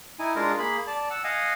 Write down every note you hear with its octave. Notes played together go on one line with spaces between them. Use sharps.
D#4 E4 G#5
G#3 D4 F4 A#4
A#3 G#4 B5
D5 A5
F#5 E6
D#5 F5 F#5 G#5